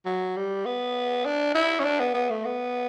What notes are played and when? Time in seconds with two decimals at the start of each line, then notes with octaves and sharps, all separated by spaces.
0.05 F#3
0.36 G3
0.65 B3
1.25 D4
1.55 E4
1.80 C#4
1.84 D4
2.00 B3
2.14 B3
2.30 A3
2.45 B3